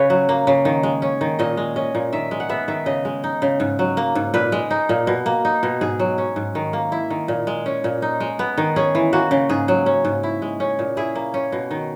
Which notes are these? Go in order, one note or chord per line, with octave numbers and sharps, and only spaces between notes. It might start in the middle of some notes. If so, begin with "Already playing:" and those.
Already playing: C#3 B4 C#5
F#3
A#3
C#3
D#3
G#3
C#4
D#3
A#2 D#5
G#3
C#4 D#5
A#2
D#3 E5
G#3
F#5
B3 E5
D#3 E5
C#3 D#5
G#3
D#4
C#3
G#2
F#3
A#3
G#2
A#2 B4
G#3
D#4
A#2
B2
A#3
D#4
B2
G#2 G#4
F#3
C#4
G#2
D#3
A#3
E4
D#3
A#2
G#3
C#4
A#2
D#4
G#3
B3
D#3
C#4 G#4
E3
A#3 F#4
C#3
G#2 G#4
F#3
C#4
G#2
E4
G#3
C#4
A#2
E4 G#4
A#3
C#4
B2
D#3